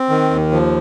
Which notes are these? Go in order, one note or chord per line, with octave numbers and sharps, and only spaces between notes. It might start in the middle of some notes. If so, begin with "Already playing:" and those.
Already playing: C4
D#3
D#2
F3